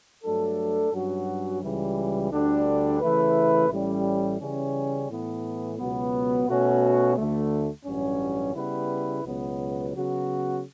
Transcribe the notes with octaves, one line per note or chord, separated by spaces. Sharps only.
G2 F#3 A3 D4 A4
G2 F#3 C#4 F#4
C#2 C#3 E3 G3
D2 D3 G3 D4
C#3 E3 A3 E4 B4
A1 A2 G3 C#4
C#3 E3 G3 C#4
A2 E3 B3
C#2 B2 F#3 B3
B2 A3 C#4 F#4
D2 D3 A3
A1 G2 F#3 C#4
C#3 G3 B3 E4 B4
C#2 B2 F#3 B3
C#3 F#3 B3 F#4